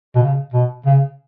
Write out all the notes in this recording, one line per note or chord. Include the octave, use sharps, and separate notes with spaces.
B2
C#3
B2
C#3